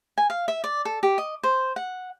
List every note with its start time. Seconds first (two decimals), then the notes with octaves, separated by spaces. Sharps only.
0.18 G#5
0.30 F5
0.48 E5
0.64 D5
0.85 A4
1.03 G4
1.18 D#5
1.43 C5
1.76 F#5